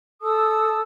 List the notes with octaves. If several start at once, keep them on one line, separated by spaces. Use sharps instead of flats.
A4 A5 D#6 E6